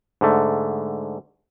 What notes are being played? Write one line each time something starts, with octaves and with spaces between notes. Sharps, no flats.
G#2 D3 A3